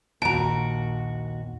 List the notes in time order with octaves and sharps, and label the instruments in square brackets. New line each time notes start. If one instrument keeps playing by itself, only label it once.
[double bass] A#1 [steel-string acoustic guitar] D#2 F#4 [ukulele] A5 A#5 [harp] D7